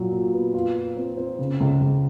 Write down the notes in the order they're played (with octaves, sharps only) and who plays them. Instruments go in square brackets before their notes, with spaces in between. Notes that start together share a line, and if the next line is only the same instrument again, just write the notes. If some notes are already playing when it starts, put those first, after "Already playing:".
Already playing: [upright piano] A#2 F#3
A#2
B3
F4
F4
C4
C4
C#3
C#2
C#2